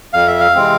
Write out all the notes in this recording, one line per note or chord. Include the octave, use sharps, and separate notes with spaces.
F2 F5
E5
F5
C3 E3 G#3 C4